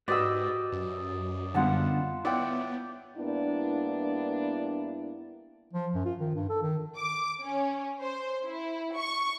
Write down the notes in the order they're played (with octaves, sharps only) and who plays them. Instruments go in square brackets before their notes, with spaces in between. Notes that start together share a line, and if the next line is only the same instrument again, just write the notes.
[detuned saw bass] G#2 [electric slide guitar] F#4 G4 B4 [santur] D5 D#5 E6
[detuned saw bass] F#2
[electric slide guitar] D3 G3 B3 [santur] F4 F#5 A5
[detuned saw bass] B3 [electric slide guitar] E4 C#5 F#5 [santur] D5 G5
[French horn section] G2 A#3 B3 D4 E4
[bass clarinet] F3
F#2
F4
D#3
G2
A4
D#3
[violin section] D6
C#4
C5
E4
C#6